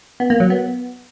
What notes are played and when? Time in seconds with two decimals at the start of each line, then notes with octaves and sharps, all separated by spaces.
0.20 B3
0.30 A#3
0.40 F#3
0.50 B3